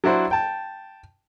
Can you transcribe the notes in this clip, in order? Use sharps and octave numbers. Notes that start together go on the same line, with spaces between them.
F#3 D4 E4 F#4 C5
G5 A5